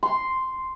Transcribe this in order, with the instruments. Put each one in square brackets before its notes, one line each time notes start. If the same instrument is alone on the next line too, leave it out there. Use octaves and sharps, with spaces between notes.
[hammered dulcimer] C6